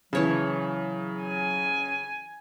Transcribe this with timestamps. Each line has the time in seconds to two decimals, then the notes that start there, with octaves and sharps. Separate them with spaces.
0.13 C#3 E3 F#3 C#5 A5
1.22 G#5